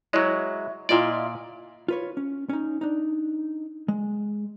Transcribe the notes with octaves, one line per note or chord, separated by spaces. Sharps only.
F#3 G#3 E4 C#5 D#5
A#2 E4 F4 D5 D#5
F4 B4 C#5
C#4
C#4 D#4
D4 D#4
G#3